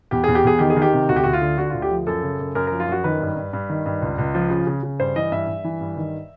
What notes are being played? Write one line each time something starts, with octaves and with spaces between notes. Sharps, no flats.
E2 G4
E2 G#4
G4
E2 G#4
D#3 G4
G#4
D#3
G4
C3
D2 F#4
G4
D2 F#4
F4
D3
D3 F#4
D2 F4
G4
F3
F#2 A4
C#3
F#2
F#2 A#4
F3 A#4
F4
F#2 F#4
D#3 B4
G2
G2
G2
D#3
G2
C#2
C#2
F3
C#3
C#3
C#3
G2 C5
E3 D#5
G2 E5
G2
E3
G2
D#3